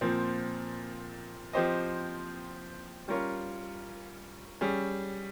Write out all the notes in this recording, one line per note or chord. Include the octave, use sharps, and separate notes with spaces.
A#2 F3 C4
F3 C4 G4 C5 D#5
G3 C#4 F4 A#4 C#5
G3 C#4 G#4